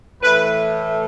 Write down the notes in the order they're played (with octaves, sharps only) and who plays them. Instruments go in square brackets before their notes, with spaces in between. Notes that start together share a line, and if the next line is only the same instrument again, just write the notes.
[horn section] A2 E3 A3 B4